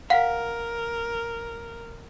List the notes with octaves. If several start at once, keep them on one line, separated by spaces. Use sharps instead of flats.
A#4 F5 F#5 B6